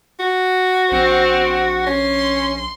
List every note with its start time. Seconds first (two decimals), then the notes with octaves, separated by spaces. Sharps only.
0.20 F#4
0.91 A#1 C4
1.87 C#4 C6